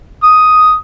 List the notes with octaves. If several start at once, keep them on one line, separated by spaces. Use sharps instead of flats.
D#6